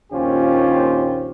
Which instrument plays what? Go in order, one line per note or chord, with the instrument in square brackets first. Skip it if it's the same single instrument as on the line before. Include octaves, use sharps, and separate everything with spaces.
[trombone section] A#1 D#2 C#4 F4 G4 C5